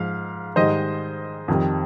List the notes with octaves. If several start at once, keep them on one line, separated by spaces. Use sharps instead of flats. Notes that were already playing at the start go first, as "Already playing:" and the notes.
Already playing: G#2 F3 F5
G#2 D#3 G3 C5 D#5
F2 D#3 G3